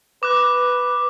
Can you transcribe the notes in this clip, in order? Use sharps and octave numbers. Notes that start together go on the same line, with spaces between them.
B4 D6 F#6